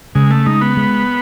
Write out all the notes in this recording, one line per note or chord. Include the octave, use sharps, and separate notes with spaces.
C#3 G#3
A3
G#3 D#4
B3
G#3